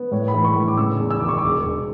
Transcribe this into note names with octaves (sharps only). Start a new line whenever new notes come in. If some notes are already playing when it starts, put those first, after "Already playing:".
Already playing: B3
A2 C#5
B5
E3
C#6
A2
D6
C#3 E6
E2
E6
E1 D6
C#6
D6
E1
E1